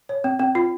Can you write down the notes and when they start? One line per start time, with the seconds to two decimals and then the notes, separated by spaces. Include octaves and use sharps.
0.09 C#5
0.24 C4
0.39 C4
0.55 F4